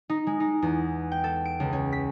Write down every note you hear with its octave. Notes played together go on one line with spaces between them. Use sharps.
D#4
G#3
D#4
E2
G5
A4
D7
C#2
C#4
B6